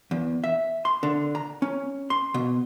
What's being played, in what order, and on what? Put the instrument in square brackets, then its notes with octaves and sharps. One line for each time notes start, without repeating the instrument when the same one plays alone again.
[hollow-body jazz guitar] E2
E5
C6
D3
A#5
C#4
C6
B2